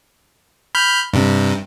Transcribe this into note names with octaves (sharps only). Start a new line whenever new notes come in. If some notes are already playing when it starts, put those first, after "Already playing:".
B5 F6 G6
G2 C3